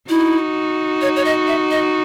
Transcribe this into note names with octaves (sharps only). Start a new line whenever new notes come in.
D#4 E4 F#4
C#5
C#5
D#5
E5
D#5